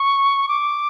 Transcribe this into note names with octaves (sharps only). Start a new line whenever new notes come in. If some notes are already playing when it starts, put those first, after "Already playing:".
Already playing: C#6
D6